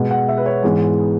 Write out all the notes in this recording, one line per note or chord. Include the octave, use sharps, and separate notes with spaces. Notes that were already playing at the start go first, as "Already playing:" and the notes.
Already playing: B2 G#3 B3 F#5
F#5
E5
B4
C#5
G#2 E3 G#3 B3